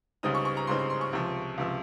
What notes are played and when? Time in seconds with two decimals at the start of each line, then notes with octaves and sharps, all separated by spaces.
0.23 C#2 C#3 G3 C4 D#4 D#6
0.35 C#6
0.45 C#6
0.57 A#5
0.67 C#2 C#3 G3 C4 D#4 C6
0.79 C6
0.90 C6
1.01 C#6
1.13 C#2 C3 F3
1.58 C#2 C3 F3